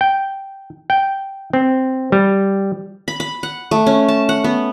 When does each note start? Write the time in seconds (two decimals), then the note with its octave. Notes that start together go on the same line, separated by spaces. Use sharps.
0.01 G5
0.90 G5
1.53 C4
2.12 G3
3.08 B5
3.20 B5
3.43 F#5
3.71 A3
3.86 C#4
4.08 A5
4.29 F#5
4.44 B3